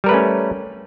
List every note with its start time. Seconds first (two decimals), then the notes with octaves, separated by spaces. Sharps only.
0.04 G3
0.06 A#4
0.09 B4
0.11 A3
0.14 C#4